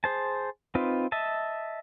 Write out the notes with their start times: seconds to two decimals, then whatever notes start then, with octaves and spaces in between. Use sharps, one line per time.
0.04 G#4 C5 A5
0.75 C4 D#4 F4 B4
1.12 D#5 E5 A5